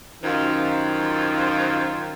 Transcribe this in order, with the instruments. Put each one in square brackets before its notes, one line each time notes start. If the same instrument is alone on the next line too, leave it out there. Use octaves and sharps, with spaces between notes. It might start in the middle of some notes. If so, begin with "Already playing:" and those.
[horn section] F#2 D#3 F3 F4